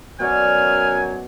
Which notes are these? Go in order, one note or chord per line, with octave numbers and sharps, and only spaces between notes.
F#2 B2 F#3 D5 G#5 F6